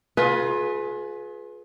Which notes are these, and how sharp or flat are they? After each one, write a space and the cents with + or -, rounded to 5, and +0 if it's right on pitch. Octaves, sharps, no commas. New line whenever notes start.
F4 +35 G#4 +35 B4 +0